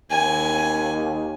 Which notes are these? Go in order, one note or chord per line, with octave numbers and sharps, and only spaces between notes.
D#2 G#5